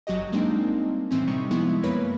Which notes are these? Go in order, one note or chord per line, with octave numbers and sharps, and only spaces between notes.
G1 F#3 F#4 G4 D#5
G3 G#3 A#3 C4 D4 D#4
A2 E3 C4 C#4
C3 G3 D#4 C#6
F3 G#3 B3 E4
F#2 A#3 B4 C#5 B5